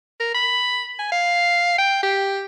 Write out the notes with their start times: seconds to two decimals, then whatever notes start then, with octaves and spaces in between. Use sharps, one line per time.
0.20 A#4
0.34 B5
0.99 G#5
1.12 F5
1.78 G5
2.03 G4